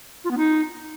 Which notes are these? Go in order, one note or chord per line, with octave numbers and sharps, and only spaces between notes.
F4
B3
D#4